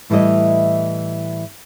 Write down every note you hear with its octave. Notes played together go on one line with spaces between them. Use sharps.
A2 E3 G3 E4 D#5